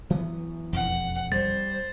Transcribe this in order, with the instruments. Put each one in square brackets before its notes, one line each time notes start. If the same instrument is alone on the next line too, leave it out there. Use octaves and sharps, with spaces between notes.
[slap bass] E3 F#3 B3
[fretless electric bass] E1 F2 [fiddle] F#5
[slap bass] G3 [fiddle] C5 [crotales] A6